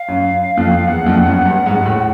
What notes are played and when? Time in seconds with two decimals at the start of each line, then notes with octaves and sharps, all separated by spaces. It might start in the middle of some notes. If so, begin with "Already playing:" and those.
Already playing: F5
0.08 F#2
0.57 F2
0.87 E2 F#5
1.06 F2
1.26 F#2
1.46 G2
1.66 G#2
1.86 A2